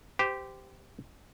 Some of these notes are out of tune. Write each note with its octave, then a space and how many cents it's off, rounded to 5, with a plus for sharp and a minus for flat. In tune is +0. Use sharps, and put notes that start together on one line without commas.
G4 +0 C5 -25